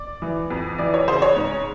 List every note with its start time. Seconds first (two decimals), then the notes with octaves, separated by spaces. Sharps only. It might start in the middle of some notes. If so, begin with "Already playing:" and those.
Already playing: D5
0.22 E3
0.50 F2
0.78 E3 D5
0.94 C#5
1.08 C#3 C5
1.22 C#5
1.36 G#2